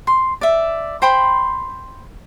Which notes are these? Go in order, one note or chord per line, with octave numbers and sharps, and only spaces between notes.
C6
D5 E5
C5 G5 B5 C6